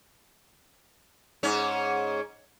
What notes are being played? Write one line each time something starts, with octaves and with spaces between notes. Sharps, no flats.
G#2 C#4